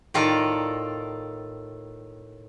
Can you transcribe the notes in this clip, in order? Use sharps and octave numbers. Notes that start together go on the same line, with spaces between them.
A2 D#3 F4 A4 D5 A#5